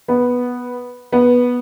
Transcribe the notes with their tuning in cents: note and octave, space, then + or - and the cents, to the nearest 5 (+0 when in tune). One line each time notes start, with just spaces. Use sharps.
B3 -5
B3 -10